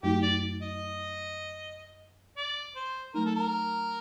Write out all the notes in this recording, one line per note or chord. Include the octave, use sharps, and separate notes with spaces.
F#2 F#3 A3 D#4 F#4 G4
D5
D#5
D5
C5
F#3 A3 D#4 A#4
A4
A#4